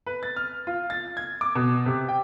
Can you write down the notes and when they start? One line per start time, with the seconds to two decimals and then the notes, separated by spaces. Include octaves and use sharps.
0.06 B4
0.23 A6
0.36 F6
0.67 F4
0.90 A6
1.17 G#6
1.41 D6
1.55 B2
1.86 C3
2.09 G5